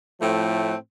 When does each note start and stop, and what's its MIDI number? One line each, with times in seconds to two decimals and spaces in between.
0.21 0.74 45
0.21 0.74 53
0.21 0.74 57
0.21 0.74 60